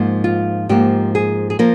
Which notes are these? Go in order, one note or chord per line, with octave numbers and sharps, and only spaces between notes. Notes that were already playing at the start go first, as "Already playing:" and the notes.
Already playing: G#2 F3 A#3
F4
G#2 F3 A#3 G4
G#4
G#4
F3 A#3 A#4